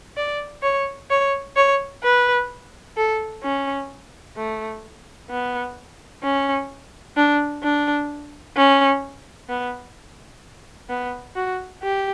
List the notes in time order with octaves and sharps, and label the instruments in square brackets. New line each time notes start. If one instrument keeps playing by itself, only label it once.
[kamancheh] D5
C#5
C#5
C#5
B4
A4
C#4
A3
B3
C#4
D4
D4
C#4
B3
B3
F#4
G4